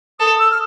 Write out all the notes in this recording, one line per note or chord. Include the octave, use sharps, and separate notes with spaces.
A4 D#6
E6
F6